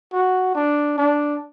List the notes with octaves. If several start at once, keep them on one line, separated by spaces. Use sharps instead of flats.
F#4
D4
D4